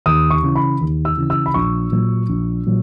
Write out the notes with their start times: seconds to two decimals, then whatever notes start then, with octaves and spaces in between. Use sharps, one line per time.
0.06 D#2 D#6
0.30 C#6
0.43 C#3 E3
0.56 B5
0.81 D#2
1.05 E6
1.17 C#3 E3
1.30 E6
1.46 B5
1.54 A#1 C#6
1.92 A#2 F#3
2.29 A#1
2.66 A#2 F#3